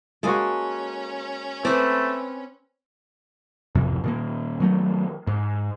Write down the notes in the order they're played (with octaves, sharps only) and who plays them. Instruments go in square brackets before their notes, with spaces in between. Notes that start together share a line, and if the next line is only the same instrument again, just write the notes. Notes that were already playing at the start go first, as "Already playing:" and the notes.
[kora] G#3 A#3 F#4 [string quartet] C#4 [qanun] G#4 A4
[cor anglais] A3 [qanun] C4 B4 C5 [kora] D5
[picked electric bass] D1 G#1 F2 C3
A#2 D#3 A#3
D#3 F#3 A3
G#2